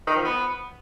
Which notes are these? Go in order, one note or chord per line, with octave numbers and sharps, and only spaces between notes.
D#3
F3
B3